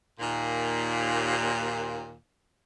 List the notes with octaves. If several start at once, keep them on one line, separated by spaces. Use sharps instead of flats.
D#2 A#2